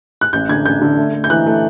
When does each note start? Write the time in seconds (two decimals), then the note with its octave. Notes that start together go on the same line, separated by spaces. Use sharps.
0.21 F#6
0.33 A1 G6
0.49 D3 G#6
0.65 A1 G6
0.81 D3
0.98 A3
1.14 A3
1.24 G6
1.30 E3 F#6
1.46 A3